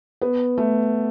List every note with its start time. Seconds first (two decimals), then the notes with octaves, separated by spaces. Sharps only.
0.22 B3
0.58 A3